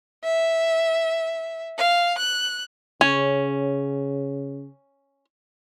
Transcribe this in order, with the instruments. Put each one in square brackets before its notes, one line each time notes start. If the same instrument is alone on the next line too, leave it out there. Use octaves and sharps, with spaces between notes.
[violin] E5
F5
F#6
[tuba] C#3 [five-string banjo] C#4